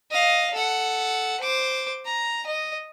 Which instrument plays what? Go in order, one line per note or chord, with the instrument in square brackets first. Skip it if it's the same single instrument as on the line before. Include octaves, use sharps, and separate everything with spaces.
[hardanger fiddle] D#5 F5
A4 F#5
C5 D6
A#5
D#5